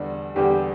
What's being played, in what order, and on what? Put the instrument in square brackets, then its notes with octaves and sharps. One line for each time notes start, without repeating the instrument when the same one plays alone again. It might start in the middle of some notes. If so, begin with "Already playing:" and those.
Already playing: [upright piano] E2 D3 G3
[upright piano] E2 D3 G3 [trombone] G4